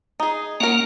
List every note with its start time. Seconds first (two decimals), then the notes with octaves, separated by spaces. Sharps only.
0.20 D#4 G#4
0.60 A#3 C#4 F#4 A#4 F#5